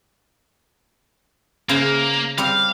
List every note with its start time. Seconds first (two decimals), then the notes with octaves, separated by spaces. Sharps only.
1.69 C#3 A#3 C5 E5
2.38 G3 C4 G4 F5